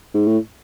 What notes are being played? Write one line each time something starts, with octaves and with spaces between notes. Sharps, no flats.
G#2
A2